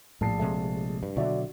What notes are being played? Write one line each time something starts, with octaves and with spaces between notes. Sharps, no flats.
A#1 A2 A5 C7
C3 G#3 A3
G2
B2 D3 F#3 F#4 D5 E5